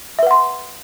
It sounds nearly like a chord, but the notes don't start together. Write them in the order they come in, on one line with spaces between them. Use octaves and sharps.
E5 B4 F#5 C6